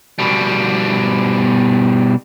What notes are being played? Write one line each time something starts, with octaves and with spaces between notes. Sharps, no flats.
B2 G3